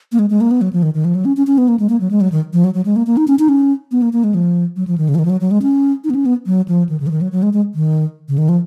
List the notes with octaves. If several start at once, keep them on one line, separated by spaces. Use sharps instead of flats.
A#3
G#3
G#3
A#3
B3
F#3
F3
D#3
D#3
F3
F#3
C#4
C#4
C#4
B3
A#3
G#3
A#3
F#3
G#3
F#3
D#3
F3
F#3
F#3
G#3
A#3
A#3
D#4
C#4
D#4
C#4
B3
A#3
A#3
G#3
F3
F#3
F3
D#3
C#3
F3
D#3
F3
F#3
F#3
G#3
C#4
D#4
B3
C#4
B3
F#3
F3
D#3
C#3
F3
D#3
F#3
F#3
G#3
G#3
D#3
C#3
D#3
F3